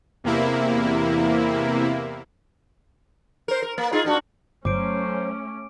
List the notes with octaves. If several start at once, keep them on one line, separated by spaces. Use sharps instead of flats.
E2 C3 A#3 E4
A#4 C5
A#4
A#3
D#4 F4 G#4
A#2 D4 F#4
G1 F#3 A3 C#4 C5 D6 D7